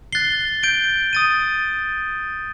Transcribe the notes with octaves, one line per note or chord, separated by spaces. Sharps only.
F#6 A6 C7 G7
G6 D7 G7
D#6 A6 D#7